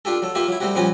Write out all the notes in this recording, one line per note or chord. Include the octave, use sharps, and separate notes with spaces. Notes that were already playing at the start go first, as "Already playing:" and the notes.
D4 F4 G4 A4
F#3 A4
A#3 F4 G4 E5
F#3 E4
G3 A3 C4 F#4 G4
A#2 F3 G3 C4 C#4 F#4